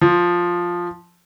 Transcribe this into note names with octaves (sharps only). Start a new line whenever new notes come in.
F3